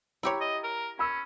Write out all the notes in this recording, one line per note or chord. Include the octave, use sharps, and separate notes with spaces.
E4 G4 C#5 A#5
D#5
A#4
C#4 B5 E6